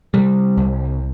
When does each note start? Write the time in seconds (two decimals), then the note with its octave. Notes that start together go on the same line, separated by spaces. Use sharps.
0.14 C3 G3
0.57 C2